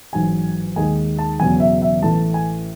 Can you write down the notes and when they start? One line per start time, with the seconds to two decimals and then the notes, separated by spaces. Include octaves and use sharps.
0.13 A1 G#2 F#3 G#5
0.76 D#2 D#3 G#3 G#5
1.18 A5
1.39 E1 E2 C#3 F#3 G#5
1.60 E5
1.82 E5
2.02 A1 A2 E3 A5
2.34 G#5